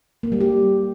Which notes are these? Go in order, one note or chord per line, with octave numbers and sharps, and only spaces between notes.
A#3
G3
G4